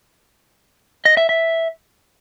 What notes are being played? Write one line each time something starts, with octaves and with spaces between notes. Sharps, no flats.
D#5
E5
E5